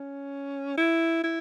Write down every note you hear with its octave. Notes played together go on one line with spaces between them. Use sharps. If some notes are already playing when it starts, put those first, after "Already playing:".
Already playing: C#4
E4
E4